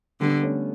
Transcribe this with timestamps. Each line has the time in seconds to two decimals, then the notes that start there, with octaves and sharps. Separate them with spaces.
0.21 D3 G3 B3
0.43 A3 C#4